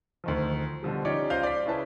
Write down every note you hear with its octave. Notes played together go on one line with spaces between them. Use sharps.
D2 D#3 F3
B2 D3 F3 G3
C#4 D#4 F4 G4 C#5 D5
C#2 C5 D#5 F5 G6
D5 B6
C#3 C#4 E4 G#4 B4 A5